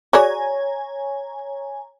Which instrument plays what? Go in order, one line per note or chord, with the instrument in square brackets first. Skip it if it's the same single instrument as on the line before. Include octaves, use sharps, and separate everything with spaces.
[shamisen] F#4 G#4 D5 [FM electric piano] C#5 G#5 A#5